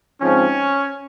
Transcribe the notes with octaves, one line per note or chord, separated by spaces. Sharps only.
G#2 F3 C4 C#4